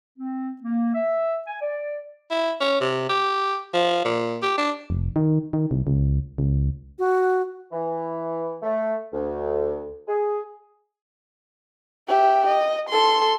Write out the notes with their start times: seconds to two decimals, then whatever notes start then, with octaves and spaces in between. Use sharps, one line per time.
0.18 C4
0.62 A#3
0.94 E5
1.47 G#5
1.61 D5
2.31 E4
2.60 C#4
2.80 C3
3.09 G4
3.74 F3
4.04 A#2
4.42 G4
4.58 D4
4.90 F1
5.16 D#3
5.53 D#3
5.71 C2
5.87 C#2
6.38 C#2
6.99 F#4
7.72 E3
8.62 A3
9.13 D2
10.08 G#4
12.08 G4 E5
12.48 D#5
12.89 A4 C6